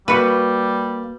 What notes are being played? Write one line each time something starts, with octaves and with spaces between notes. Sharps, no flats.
G3 A#3 F#4 B4 F5